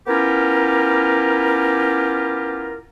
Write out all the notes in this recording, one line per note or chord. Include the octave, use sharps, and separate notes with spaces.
B3 C#4 E4 F4 G4 A#4